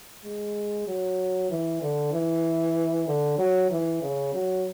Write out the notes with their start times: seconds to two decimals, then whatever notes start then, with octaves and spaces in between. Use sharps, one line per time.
0.25 G#3
0.87 F#3
1.50 E3
1.82 D3
2.12 E3
3.08 D3
3.38 F#3
3.71 E3
4.02 C#3
4.34 F#3